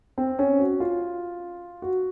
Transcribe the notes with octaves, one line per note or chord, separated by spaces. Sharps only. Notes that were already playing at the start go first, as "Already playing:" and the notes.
C4
C#4
F#4
F4
F#4